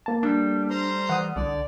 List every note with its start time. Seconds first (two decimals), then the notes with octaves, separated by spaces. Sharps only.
0.06 A#3 A5
0.23 G3 A3 D4
0.70 C5 A#5 C6
1.09 E3 F#5 D#6
1.36 C2 D3 D5